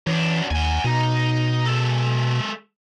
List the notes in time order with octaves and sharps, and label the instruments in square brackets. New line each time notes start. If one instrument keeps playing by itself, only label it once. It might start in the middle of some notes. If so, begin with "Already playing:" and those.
[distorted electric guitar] F#2 D4 [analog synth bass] E3
[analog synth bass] D#2 [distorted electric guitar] F#5 G#5
[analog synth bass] B2 [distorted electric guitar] D#4
[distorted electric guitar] G#3 A4